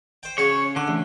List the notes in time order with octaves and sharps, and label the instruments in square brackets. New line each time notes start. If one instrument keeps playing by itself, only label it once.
[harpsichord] C5 G5
[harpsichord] C#3 F#4 [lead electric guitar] C#5
[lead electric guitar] D3 [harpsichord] G#5
[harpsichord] A1